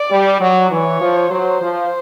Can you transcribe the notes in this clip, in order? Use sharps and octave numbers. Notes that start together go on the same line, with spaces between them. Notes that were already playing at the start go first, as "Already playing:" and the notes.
Already playing: D5
G3
F#3
E3 C#5
F3
F#3 C5
F3